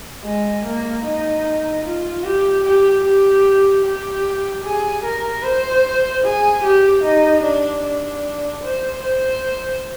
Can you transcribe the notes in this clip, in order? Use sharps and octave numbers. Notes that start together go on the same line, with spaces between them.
G#3
A#3
D#4
F4
G4
G4
G4
G4
G#4
A#4
C5
G#4
G4
D#4
D4
D4
C5
C5